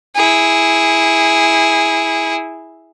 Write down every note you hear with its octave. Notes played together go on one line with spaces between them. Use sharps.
E4 G#4